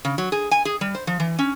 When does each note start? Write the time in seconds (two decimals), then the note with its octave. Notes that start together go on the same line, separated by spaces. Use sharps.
0.05 C#3
0.18 F#3
0.32 G#4
0.51 G#5
0.65 G#4
0.81 G3
0.95 C5
1.07 F3
1.20 E3
1.39 C#4